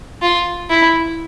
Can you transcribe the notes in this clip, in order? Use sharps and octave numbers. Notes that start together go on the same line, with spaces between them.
F4
E4